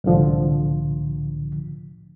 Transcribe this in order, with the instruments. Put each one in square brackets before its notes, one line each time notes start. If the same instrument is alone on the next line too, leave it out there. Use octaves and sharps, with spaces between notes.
[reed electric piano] C2 A2 D3 F3